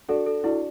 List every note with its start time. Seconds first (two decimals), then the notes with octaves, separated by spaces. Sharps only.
0.09 D4 F#4 A4
0.26 A4
0.44 D4 E4 F#4